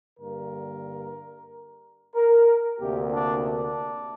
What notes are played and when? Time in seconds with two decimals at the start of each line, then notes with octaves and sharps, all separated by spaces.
0.19 G2 D3 A#3 A#4
2.15 A#4
2.80 D2 C3 A#3 G4
3.12 D4
3.45 D4